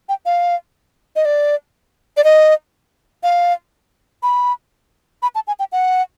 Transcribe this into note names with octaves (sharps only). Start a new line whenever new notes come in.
G5
F5
D#5
D5
D5
D#5
F5
B5
B5
A5
G#5
G5
F#5